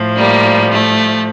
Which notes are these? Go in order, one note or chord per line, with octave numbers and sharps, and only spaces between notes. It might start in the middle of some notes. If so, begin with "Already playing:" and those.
Already playing: A2 F3
G3 A#3
A3